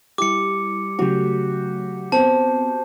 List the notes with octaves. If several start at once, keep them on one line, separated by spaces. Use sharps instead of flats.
G3 E4 G4 D6 C#7
C#3 F#3 A3 F#4 G4
B3 C4 C5 A5